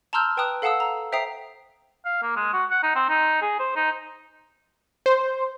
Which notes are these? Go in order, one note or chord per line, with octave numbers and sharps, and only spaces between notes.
A5 A#5 C6 E6 F6 G6
B4 G5 A5 A#5 D#6 F#6
A4 F5 F#5 A5 D#6 E6
A#5
C5 E5 G5 A#5 D#6 C7
F5
A#3
G#3
F#4
F#5
D#4
C4
D#4
G#4
C5
D#4
C5